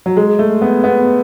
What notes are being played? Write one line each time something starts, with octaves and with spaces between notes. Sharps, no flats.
F#3
G#3
A3
B3
B3